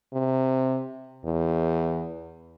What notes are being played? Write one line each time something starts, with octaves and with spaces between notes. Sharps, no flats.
C3
E2